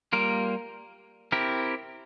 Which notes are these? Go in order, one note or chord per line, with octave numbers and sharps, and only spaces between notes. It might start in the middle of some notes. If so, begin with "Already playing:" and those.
G3 A#3 F4 A#4
C4 E4 G4 A#4